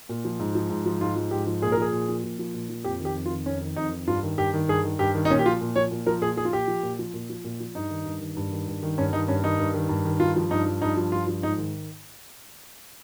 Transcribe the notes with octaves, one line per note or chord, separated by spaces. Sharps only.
A#2
F3
G#2
F3
G#2
F3
G#2 F4
F3
G#2 G4
F3
A#2 G#4
A#4
F3 G#4
A#2
F3
A#2
F3
A#2
F3
F2 G4
D#3
G4
F2
F4
D#3
F2 C#4
D#3
F2 D#4
D#3
G2 F4
D#3
G2 G4
D#3
G2 G#4
D#3
G2 G4
D#3
D#4
A#2 C#4
G4
F3 F4
A#2
F3 C#5
A#2
F3 A#4
A#2 G#4
F3 G#4
F4
A#2 G4
F3
A#2
F3
A#2
F3
A#2
F3
G2 D#4
D#3
G2
D#3
G2
D#3
G2
D#3
G2 C#4
D#3 D#4
G2 C#4
D#3 D#4
G2
D#3
G2
D#3
G2 F4
F3
G2 D#4
F3
G2 D#4
F3
G2 F4
F3
G#2 D#4
D#3